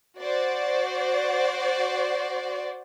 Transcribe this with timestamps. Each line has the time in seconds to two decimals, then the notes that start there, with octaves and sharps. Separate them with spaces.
0.19 F#4 C5 D5